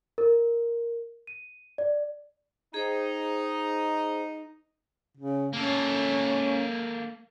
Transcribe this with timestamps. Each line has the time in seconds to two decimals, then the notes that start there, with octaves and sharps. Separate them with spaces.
0.18 A#4
1.27 D#7
1.78 D5
2.74 D#4 G#4 C5 G5
5.18 C#3
5.53 A#3 C#4 A4